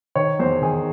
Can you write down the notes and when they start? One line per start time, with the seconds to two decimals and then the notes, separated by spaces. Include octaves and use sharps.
0.16 D#3 C#5
0.39 E2 C5
0.62 D#3 G#4